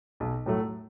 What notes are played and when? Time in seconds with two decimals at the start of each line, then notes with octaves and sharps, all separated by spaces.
0.20 B1
0.46 A2 F#3 A3